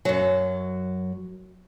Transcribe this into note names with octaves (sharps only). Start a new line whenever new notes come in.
F#2 F#3